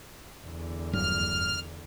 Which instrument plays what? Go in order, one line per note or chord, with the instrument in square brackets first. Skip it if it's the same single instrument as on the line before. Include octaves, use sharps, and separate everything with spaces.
[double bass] E2 D3
[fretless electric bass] F1 G2 F#3 [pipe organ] F6